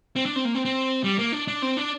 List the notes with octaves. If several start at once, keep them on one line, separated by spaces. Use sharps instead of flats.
C4
D4
C4
A#3
C4
C4
G3
A#3
D4
D4
C4
D4